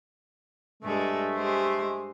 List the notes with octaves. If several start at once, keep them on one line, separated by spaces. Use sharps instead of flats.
G2 G#3 A3 A4
G#3 G4 C5